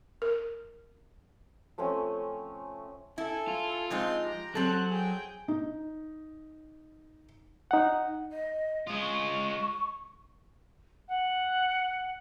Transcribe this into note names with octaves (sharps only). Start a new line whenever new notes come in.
A#4
F3 A3 C4 C#4
E4 A4 G#5
F4
F3 G#3 C4 D#4 C6
G4 A#5
F#3 C4 A4 F#6
G#4 G5
D#4
D#4 F#5
D#5
G#3 F4 D#6
C#6
F#5